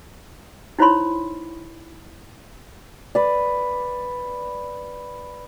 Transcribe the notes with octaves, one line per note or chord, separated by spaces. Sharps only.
D#4 E4 C5 C#5 B5 C6
B4 D5